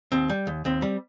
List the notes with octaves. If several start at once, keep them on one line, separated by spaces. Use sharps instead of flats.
D#2 C4
G3
D#2
D#2 C4
G3